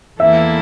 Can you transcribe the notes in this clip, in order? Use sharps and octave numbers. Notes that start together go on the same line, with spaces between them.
E2 E3 A#3 E4 A4 E5